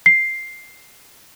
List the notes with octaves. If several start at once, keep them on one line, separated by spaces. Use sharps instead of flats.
C7